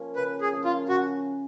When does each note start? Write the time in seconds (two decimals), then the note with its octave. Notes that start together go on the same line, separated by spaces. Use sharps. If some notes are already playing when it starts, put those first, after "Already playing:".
Already playing: F3 A#3 C#4
0.16 C#3 B4
0.41 G#4
0.53 F3 A#3 C#4
0.65 F4
0.89 C#3 F#4